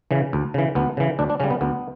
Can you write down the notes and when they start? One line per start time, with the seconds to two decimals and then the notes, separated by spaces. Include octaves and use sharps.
0.11 C#3 E3
0.33 D2
0.54 C#3 E3
0.75 D2 B3
0.97 C#3 E3
1.19 D2 D4
1.30 D4
1.40 C#3 G3 C#4
1.51 B3
1.61 D2 B3